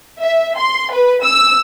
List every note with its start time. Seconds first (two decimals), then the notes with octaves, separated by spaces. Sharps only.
0.20 E5
0.57 C6
0.92 B4
1.23 E6